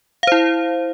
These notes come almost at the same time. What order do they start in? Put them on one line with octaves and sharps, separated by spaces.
F5 C5 E4